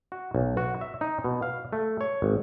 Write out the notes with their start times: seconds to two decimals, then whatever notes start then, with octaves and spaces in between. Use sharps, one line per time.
0.12 F#4
0.35 B1
0.57 F#4
0.81 E5
1.01 D#4
1.24 B2
1.42 F5
1.73 A3
2.01 C#5
2.22 G#1